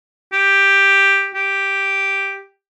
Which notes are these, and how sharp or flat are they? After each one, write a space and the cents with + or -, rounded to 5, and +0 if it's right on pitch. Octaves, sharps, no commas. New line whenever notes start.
G4 +5
G4 +0